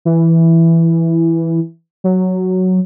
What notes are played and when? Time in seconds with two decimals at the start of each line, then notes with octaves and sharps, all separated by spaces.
0.05 E3
2.04 F#3